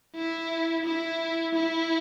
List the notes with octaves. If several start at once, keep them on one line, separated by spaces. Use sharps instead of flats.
E4
E4
E4